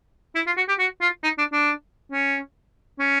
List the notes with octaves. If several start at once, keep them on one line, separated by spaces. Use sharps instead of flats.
E4
F4
F#4
G4
F#4
F4
D#4
D4
D4
C#4
C#4